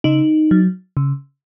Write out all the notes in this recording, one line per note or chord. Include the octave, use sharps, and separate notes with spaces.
C#3 D#4
F#3
C#3